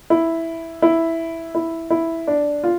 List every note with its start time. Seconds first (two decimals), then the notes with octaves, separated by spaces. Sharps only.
0.10 E4
0.82 E4
1.55 E4
1.90 E4
2.27 D4
2.64 F4